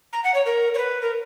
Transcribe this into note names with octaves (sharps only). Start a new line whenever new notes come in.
A#5
F#5
C#5
A#4
C#5
B4
A#4